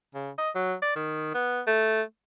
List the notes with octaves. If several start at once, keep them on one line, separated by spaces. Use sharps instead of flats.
C#3
D#5
F#3
D5
D#3
B3
A3